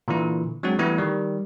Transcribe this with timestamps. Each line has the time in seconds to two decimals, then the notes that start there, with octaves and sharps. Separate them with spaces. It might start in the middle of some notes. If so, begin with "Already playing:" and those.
0.08 A#2 D3 E3 E4
0.63 F#3 G#3 C4 D4 F#4
0.79 E3 G3 A3 B3 E4
0.98 D#3 G3